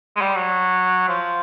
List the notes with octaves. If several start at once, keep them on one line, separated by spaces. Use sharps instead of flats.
G#3
G3
F#3
F3